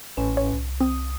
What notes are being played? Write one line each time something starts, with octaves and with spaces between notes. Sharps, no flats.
A1 A2 C#4 B4 E7
C#5
C2
C4 D#6